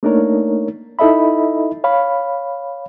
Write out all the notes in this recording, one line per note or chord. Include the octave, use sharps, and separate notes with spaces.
A3 A#3 D4 D#4 A#4 C#5
D#4 E4 A4 D#5 E5 B5
C#5 F5 B5